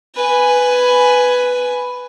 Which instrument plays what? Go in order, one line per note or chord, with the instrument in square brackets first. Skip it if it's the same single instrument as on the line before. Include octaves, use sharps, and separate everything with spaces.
[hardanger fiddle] B4 G#5